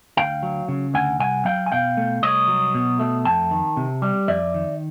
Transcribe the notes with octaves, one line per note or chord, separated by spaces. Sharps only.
D2 F5 G5
F#3
C#3
D2 F#5 G#5
C2 F#5 G#5
F#3 F5 G5
G#5
B2 F5 G5
A3
C2 C#5 D#5
F#3
B2
A3
F2 G5 A5
D#3
C3
G3
F2 D5 E5
D#3